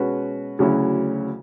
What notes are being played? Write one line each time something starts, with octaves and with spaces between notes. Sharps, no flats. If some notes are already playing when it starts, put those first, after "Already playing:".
Already playing: B2 G#3 C#4 F#4 B4
D2 C#3 F#3 C#4 E4